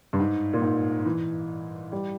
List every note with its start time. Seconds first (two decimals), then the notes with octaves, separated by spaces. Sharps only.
0.13 G2
0.19 G#2
0.53 A#2
0.62 G#2
1.05 E3
1.92 G3